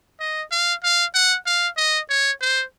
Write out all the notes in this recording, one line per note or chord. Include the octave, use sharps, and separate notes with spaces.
D#5
F5
F5
F#5
F5
D#5
C#5
C5